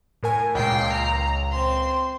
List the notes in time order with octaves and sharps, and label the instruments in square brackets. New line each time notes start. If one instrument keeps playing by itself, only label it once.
[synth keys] A2 A#4 G#5
[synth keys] C#2 A#2 [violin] G5 C7
[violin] A#5
C4 C6